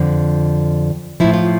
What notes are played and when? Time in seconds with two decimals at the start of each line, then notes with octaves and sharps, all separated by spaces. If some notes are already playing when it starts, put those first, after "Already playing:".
Already playing: F2 D3 F3
1.20 A2 F3 E4
1.34 F4